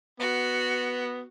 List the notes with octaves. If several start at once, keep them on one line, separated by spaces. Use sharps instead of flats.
B3 F#4